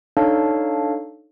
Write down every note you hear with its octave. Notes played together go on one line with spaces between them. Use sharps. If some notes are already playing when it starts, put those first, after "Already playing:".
D4 D#4 A4 C#5 F5 A5